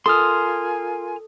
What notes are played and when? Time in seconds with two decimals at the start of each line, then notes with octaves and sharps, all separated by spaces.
0.06 F4 A4 A#4 G#5 C6 D#6 F6